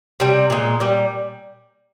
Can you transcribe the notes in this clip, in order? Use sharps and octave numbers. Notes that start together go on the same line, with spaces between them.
C3 G3
A#2 G#3
A#2 G3